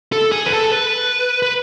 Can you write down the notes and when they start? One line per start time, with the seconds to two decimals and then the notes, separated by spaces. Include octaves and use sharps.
0.12 A4
0.32 G#4
0.46 B4
0.52 A4
0.71 B4
1.42 B4